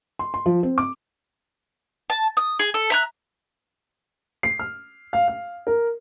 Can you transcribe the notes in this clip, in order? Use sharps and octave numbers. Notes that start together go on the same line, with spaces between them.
C6
C6
F3
C4
D6
A5
D#6
G#4
A4
E5 A#5 F#6
C7
F6
F5
F5
A#4